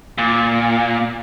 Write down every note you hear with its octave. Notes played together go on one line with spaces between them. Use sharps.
A#2